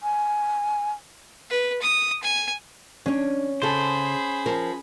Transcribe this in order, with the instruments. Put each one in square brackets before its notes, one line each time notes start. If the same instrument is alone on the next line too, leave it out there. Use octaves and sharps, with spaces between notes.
[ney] G#5
[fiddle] B4
D#6
G#5
[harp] C#4 [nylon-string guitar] D4 C#5
[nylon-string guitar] C#3 A4 [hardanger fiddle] G#4 B5 [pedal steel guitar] C5
[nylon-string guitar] F3 A#4